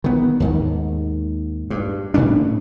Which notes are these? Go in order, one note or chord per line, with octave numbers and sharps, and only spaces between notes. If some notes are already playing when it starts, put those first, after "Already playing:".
D#3 B3
D#2 G#2 D#3
G2
A2 G3 C#4 D4